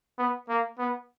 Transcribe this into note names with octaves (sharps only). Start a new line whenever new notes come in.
B3
A#3
B3